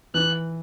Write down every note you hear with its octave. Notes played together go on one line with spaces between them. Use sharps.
E3 F#6